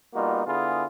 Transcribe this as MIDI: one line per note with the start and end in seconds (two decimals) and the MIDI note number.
0.14 0.43 55
0.14 0.43 58
0.14 0.43 59
0.14 0.43 63
0.14 0.43 65
0.14 0.43 66
0.47 0.84 50
0.47 0.84 59
0.47 0.84 64
0.47 0.84 65
0.47 0.84 68